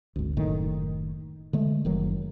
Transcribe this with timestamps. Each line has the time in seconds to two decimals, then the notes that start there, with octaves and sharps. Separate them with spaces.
0.16 G#1 D2
0.37 F#1 A2 D#3
1.53 D3 G#3 A3
1.85 F#1 D#3 F#3